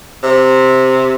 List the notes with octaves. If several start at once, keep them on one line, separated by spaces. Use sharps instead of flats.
C3